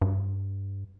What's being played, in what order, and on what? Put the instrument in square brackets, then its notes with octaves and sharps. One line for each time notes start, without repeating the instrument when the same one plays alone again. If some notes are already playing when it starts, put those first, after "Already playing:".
[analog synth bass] G2